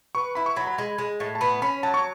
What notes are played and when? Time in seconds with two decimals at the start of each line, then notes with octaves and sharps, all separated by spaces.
0.15 B4 C#6
0.35 E4 B5
0.46 C#6
0.56 F#3 B5
0.67 B5
0.78 G#3
0.98 G#3
1.20 A2
1.35 A5
1.41 B3 B5
1.62 C#4 B5
1.83 F#3 A5
1.94 C#6